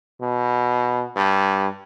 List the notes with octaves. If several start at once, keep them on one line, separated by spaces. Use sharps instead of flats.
B2
G2